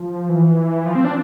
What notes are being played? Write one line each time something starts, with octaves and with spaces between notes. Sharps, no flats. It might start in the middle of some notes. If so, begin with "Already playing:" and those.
Already playing: F3
E3
F3
C4
D4